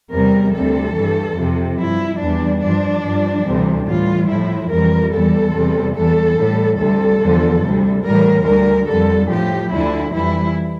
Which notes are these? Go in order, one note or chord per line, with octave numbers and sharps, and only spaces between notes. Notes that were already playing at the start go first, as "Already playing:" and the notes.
E2 C3 G3 A#4
D2 C3 G3 A4
G2 E3 G3
F2 C3 F3
G2 F3 E4
E2 E3 G3 D4
G2 F3 D4
G2 F3
D2 C3 E3 G3
A2 E3 G3 F4
A2 F3 E4
F2 E3 G3 A#4
E2 E3 G3 A4
E2 C3 G3
E2 E3 G3 A4
A2 G3
D2 C3 G3 A4
E2 D3 F3
D2 C3 G3
A2 E3 G3 A#4
D2 D3 G3 A#4
F2 D3 G3 A4
A2 F3 G4
D2 D3 F3 E4
F2 E3 G3 E4